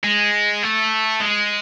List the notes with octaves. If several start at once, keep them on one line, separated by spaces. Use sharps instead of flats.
G#3
A3
G#3